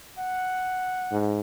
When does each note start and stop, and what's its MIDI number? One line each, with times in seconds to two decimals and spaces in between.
0.18 1.27 78
1.11 1.41 44